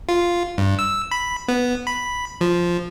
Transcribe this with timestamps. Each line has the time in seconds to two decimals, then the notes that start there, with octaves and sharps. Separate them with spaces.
0.09 F4
0.58 G2
0.79 E6
1.11 B5
1.48 B3
1.87 B5
2.41 F3